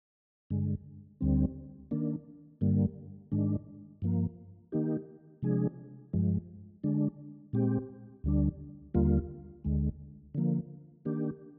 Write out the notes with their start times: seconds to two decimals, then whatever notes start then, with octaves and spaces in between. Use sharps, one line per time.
0.50 G2 D3 G#3
1.21 D2 D3 G3 C4
1.91 D#3 A#3 D4
2.61 G2 D3 G3 A#3
3.32 G#2 D#3 G#3 D4
4.02 G2 F3 A#3
4.72 D#3 A#3 D#4 G4
5.42 C3 F3 G#3 D4 G#4
6.13 G2 F3 G#3
6.84 D3 G#3 D4
7.53 A#2 G#3 C4 G4
8.24 D2 D3 G3 D4
8.94 D#2 D3 G3 A#3 F4
9.64 D2 D3 G#3
10.35 D3 F3 A#3
11.05 D#3 A#3 D4 G4